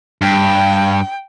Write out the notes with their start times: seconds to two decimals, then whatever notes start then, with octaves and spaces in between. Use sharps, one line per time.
0.21 G2 G5